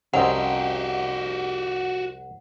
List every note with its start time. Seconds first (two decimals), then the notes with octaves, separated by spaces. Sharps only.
0.13 C2 F2 C#4 D#4 F#4 G4 C5 F#5